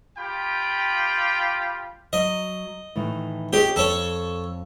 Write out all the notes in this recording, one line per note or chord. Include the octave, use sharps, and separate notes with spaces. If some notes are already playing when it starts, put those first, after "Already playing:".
F4 G4 G5 B5
F#3 D#5
A2 D#3 E3
G4 G#4 C#5 D#5
F2 A4 C#5